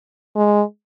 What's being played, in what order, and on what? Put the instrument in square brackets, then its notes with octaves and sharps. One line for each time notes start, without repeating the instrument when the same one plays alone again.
[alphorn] G#3